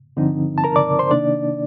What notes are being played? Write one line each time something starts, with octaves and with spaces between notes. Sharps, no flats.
G2 D3 F3 C4 D#4
A5
A#4 A#5
D5 D6
C5 C6
C3 D#3 A#3 D4 D#4 D5